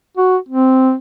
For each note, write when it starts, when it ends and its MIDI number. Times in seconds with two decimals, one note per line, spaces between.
0.17 0.37 66
0.49 0.94 60